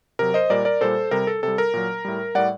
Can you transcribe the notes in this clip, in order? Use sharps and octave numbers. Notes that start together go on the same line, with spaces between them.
C3 F#3 A#4
C5 D#5
A#2 G3 A#4 D5
A#4 D5
A#2 G3 A4 C5
C3 G3 A#4
A4
C3 G3 A4
A#4
A#2 F#3
A2 G3
A2 G3 D5 F#5